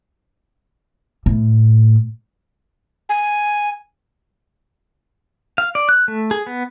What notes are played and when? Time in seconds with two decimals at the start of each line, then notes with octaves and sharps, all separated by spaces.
1.26 A2
3.09 G#5
5.58 F5
5.75 D5
5.89 F#6
6.08 A3
6.31 G#4
6.47 B3